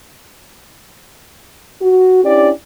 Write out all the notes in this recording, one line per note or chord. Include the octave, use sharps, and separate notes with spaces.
F#4
C#4 D4 E4 G4 D5